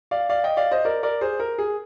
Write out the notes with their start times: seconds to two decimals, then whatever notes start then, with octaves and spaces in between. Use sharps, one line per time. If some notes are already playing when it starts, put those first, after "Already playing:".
0.11 D5 F5
0.29 D5 F5
0.44 D#5 G5
0.57 D5 F5
0.71 C5 D#5
0.85 A#4 D5
1.03 A#4 D5
1.21 G#4 C5
1.40 A#4
1.58 G#4